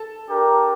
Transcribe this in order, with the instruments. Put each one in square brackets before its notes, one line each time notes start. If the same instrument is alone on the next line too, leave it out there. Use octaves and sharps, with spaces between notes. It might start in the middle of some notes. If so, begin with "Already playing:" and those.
Already playing: [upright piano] A4 A5
[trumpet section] D4 G4 A#4